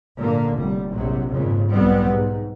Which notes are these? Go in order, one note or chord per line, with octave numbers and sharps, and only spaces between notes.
A#2 D3 A#3
F1 G3
A#1 C3 F#3
G#1 F2 A#2 C#3
B1 F2 G3 B3 C4
G#2